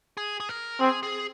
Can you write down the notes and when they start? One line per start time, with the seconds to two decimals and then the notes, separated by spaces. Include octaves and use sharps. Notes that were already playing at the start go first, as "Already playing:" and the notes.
0.17 G#4
0.40 G#4
0.49 A#4
0.80 C4 G#4
1.03 G#4